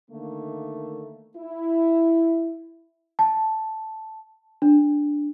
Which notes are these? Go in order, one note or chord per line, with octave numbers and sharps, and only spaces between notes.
D3 D#3 A3 A#3
E4
A5
D4